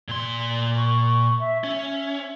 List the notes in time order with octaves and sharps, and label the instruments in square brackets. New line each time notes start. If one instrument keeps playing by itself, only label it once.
[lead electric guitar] A#2 C6
[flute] C#6
E5
[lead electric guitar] C#4 [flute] E5